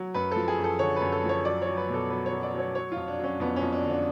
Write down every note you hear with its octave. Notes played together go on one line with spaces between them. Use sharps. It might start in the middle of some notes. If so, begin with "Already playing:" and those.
Already playing: F#3
F#2 B4
F3 A4
G#4
F#2
A4
D3 C#5
F#2 B4
A4
F3
C#5
F#3 D5
F#3 C#5
B4
B2 A4
F#3 B4
C#5
F#3
D5
F#3 C#5
F#3 C#5
F2 F4
D4
F#3 C#4
F2 B3
C#4
F2
D4
D3
D4